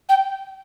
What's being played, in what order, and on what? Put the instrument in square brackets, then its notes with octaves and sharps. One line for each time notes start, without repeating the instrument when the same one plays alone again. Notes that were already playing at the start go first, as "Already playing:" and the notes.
[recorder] G5